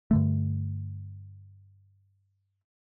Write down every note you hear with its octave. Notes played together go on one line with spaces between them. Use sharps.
G2 D3 A3